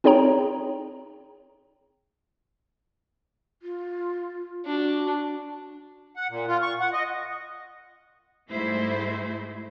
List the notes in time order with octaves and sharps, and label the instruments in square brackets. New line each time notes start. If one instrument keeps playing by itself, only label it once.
[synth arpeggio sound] C4 D#4 G#4 C#5 G5 A#5
[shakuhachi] F4
[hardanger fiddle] D4 [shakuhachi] F#4
[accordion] F#5
A#2
F4
C#6
F#5
D#5
[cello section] G#2 G3 A3 E4 C5